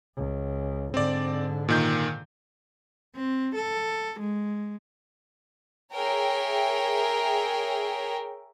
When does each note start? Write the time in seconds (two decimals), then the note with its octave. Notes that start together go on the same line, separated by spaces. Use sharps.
0.16 C#2
0.94 G#2 D3 C4 D5
1.68 A#2 D#3 G6
3.16 C4
3.56 A4
4.20 G#3
5.94 G#4 A#4 C#5 E5 G5